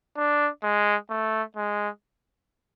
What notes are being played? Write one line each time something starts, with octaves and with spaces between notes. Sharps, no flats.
D4
G#3
A3
G#3